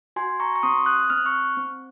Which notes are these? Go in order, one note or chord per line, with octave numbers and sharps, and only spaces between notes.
F#4 G#5 C6
A#5 C#6
C#6
C4 C6 D#6
D#6 F#6
C4 F6
F#6
C#6 F6
C4